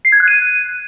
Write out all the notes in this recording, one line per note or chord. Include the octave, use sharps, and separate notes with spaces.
C7
G#6
F#6
D#7